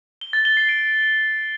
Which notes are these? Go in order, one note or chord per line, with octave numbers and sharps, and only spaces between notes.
G7
A6
G7
C7
D7